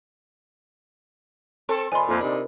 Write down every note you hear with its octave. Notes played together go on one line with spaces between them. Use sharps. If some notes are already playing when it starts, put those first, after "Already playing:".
C4 A4
A#2 C5 D#5 G#5 B5 C6
F2 A3 A#3 F4 C5
C3 D4 D#4